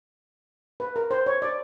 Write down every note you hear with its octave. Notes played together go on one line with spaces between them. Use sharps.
B4
A#4
C5
C#5
D5